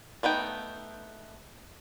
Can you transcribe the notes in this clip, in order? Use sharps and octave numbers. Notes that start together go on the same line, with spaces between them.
A3 B3 D#4 G5